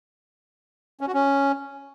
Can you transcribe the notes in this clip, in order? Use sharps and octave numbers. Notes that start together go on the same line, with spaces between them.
C#4
F#4
C#4